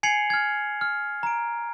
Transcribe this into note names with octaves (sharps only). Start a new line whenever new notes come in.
G#5 G#6 C7 C#7 F7 F#7
F6 G#6
F6
A#5 D7